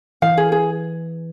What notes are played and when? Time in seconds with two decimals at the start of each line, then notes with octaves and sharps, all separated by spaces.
0.22 E3 F5
0.37 G#4
0.52 G#4